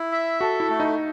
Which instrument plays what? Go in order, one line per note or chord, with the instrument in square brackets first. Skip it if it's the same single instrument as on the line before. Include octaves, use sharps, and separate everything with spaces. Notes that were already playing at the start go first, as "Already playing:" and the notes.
Already playing: [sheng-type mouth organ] E4
E5
[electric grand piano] F#4 [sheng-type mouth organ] A4
[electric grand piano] E4
[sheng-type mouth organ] A3
[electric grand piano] D#4